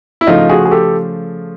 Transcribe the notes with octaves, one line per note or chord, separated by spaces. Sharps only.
E4
C#3 F3 A3 D#4 F4
F#4 G#4
G#4
G4 A4